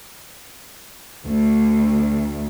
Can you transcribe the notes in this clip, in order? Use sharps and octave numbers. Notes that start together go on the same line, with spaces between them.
D2